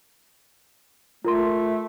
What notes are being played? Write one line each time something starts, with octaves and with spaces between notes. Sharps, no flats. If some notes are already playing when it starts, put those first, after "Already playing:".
A3 F4 A#4 C6